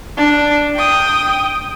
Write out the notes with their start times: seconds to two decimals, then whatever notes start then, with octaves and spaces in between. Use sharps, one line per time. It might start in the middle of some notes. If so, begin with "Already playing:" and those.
0.17 D4
0.76 G5 D#6